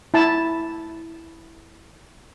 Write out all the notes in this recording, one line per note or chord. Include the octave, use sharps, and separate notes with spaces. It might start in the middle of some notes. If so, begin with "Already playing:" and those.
E4 A5